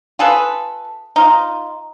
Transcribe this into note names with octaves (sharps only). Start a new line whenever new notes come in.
F4 G#4 A4 B4
D#4 F4